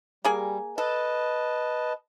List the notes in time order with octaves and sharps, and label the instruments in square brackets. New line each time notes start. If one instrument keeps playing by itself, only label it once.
[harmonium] G3 [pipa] A#3 G#4 G#5
[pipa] A4 [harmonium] B4 D#5 A5